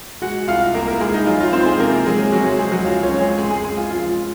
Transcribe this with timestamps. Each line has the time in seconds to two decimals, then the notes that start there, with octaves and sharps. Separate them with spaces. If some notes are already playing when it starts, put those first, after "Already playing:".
0.22 G#3 F#4 F#5
0.48 C2 F4 F5
0.74 C2 A#3 A#4
0.87 A#3 A#4
1.01 C2 G#3 G#4
1.14 D#4
1.27 F#3 F4
1.40 F4
1.53 C4 D#4 C5
1.66 G#3 G#4
1.80 C3 A#3 A#4
2.06 F#3 G#3 G#4
2.33 C3 F#3 F#4
2.45 G#3 G#4
2.59 G#3 C4 G#4
2.72 F#3 F#4
2.85 C#2 F4
3.03 C#4 C#5
3.11 C4
3.20 G#3 G#4
3.38 F#2 G#3 G#4
3.51 G#3 G#4
3.64 F#2 G#3 G#4
3.77 F4
3.91 F3 F4